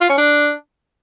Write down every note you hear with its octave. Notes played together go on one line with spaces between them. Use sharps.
F4
C#4
D4